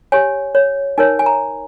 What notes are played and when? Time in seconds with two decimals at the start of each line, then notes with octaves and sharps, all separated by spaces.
0.12 G4 C#5 G#5
0.55 C#5
0.98 D#4 A#4 C#5 G#5
1.19 G#5
1.26 A#5